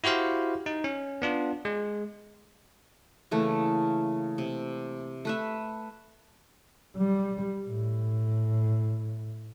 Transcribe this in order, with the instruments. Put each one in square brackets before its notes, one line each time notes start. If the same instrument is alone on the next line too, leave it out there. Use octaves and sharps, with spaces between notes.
[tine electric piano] E4 F#4 G4 C5 F5
D#4
C#4
B3 D4 F4
G#3
[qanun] C#3 E3 A3 A#3
C3
A3 B4 E5
[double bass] G3
A2